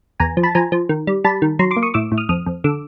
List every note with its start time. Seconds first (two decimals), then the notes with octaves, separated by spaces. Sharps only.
0.20 E2 G#5 A#5
0.37 F3
0.43 A5 B5
0.55 F3 G#5 A#5
0.72 F3
0.89 D#3
1.07 G3
1.24 G3 A5 B5
1.42 D#3
1.59 F#3 A#5 C6
1.71 C6 D6
1.76 A#3
1.83 C#6 D#6
1.94 A2 D6 E6
2.12 A2
2.18 D#6 F6
2.29 F2 D#6 F6
2.46 F2
2.64 D3 D6 E6